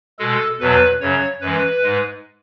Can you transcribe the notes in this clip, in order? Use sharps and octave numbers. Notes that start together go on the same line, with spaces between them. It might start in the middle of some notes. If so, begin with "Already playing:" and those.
B2 G#3 A4
E2 B2 F#3 B4
F#2 C#3 F#3 C#5
F#2 E3 G#3 B4
G#2 G#3